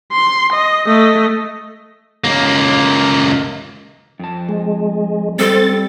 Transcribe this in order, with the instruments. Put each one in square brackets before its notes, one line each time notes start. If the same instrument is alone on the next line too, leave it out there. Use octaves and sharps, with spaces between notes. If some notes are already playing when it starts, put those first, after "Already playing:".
[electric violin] C6
D#5
A3 D#5
[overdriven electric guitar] C#2 A#3
[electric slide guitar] F2 A5
[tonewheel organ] G#3
[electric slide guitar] G3 G4 [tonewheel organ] C4 A6 [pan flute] A4